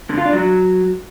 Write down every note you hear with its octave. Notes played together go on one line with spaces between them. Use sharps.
D3
F4
D4
F#3